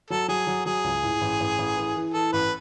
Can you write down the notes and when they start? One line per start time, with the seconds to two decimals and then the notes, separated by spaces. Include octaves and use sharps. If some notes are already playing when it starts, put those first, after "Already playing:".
0.10 F#3 A4
0.28 F#3 G#4
0.47 F#3
0.66 F#3 G#4
0.84 C#2
1.03 A2
1.21 A1
1.40 A1
1.58 A1
1.77 E3
1.96 E3
2.14 E3 A4
2.33 A1 B4